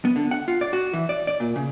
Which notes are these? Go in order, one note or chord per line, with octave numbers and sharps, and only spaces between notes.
B3
D3
F#5
F4
D5
F#4
E3
D5
D5
A#2
C#3